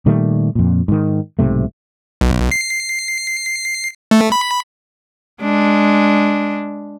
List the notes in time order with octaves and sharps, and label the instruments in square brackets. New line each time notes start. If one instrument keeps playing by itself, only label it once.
[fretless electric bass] A#2 D#3 G3 A3
F2 A#2
G#2 D#3
B1 G#2 C3 A3
[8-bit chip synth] B1
C7
A3
B5
[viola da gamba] G#3 D4